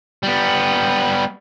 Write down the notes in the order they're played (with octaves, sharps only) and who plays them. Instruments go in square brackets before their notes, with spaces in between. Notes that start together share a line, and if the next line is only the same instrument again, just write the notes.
[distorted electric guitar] G3 B3